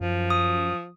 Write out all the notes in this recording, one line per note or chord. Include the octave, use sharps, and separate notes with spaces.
F#2 F3
D#6